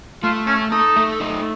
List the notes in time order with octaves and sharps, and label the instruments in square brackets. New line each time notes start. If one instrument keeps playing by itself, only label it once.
[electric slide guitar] A3 [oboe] F4
[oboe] C#4 [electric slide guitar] A4
[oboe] D#4 [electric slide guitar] A4
[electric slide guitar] A3
D#4